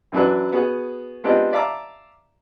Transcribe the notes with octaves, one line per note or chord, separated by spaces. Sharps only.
F#2 E3 F#3 D4 B4
B3 F#4 G#4
G#3 B3 C4 D4 F4 G4
D5 E5 F5 A5 A#5 D6